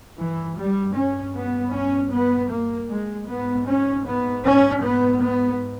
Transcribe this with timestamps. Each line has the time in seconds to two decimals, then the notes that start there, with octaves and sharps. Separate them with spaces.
0.17 G2 E3
0.57 G3
0.95 C#4
1.34 B3
1.73 C#4
2.12 B3
2.50 A#3
2.89 G#3
3.28 G#2 B3
3.67 C#4
4.05 B3
4.45 C#4
4.83 B3
5.22 B3